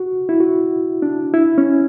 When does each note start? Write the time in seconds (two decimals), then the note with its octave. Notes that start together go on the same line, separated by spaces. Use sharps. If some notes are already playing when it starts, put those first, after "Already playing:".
Already playing: F#4
0.29 E4
0.40 F#4
1.02 D4
1.34 E4
1.58 C#4